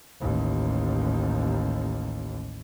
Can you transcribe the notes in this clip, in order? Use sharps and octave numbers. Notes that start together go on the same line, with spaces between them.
A1 D#2